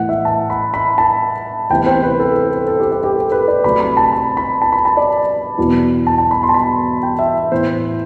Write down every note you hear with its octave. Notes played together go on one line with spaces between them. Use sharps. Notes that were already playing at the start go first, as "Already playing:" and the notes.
Already playing: A2 E3 A3 F#5
E5
A5
B5
B5
A5
D2 C3 E3 B3 E4 G5
C5
B4
A4
A4
A4
A4
G4
G4
G4
A4
B4
D5
D2 C3 F#3 A3 C4 B5
B5
A5
B5
B5
A5
B5
A5
D5
E2 B2 F#3 B3 E4
A5
A5
B5
C6
A5
B5
G5
E5
A2 E3 B3 E4 C5